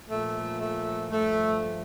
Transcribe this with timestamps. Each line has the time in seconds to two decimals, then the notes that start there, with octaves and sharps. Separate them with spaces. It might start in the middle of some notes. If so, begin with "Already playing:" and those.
0.09 A#2 F3 A3
0.59 A3
1.11 G2 F3 A3